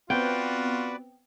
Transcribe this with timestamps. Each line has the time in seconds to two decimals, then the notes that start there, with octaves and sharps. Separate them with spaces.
0.10 B3 C4 F4 F#4 B4 D5 G5